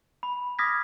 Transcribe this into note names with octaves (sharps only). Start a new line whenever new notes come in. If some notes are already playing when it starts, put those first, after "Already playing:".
B5
D6 D#6 F6 G#6 A#6 B6